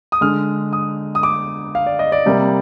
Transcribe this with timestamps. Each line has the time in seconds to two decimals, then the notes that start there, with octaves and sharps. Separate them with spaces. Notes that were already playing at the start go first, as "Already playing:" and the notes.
0.12 D#6
0.21 D3 G#3 F6
0.73 D#6
1.15 D#6
1.23 D6
1.75 F5
1.86 D5
1.99 D#5
2.12 D5
2.26 C3 G3 A#3